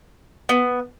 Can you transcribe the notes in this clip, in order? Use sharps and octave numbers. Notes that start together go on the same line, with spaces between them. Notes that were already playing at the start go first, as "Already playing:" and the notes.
B3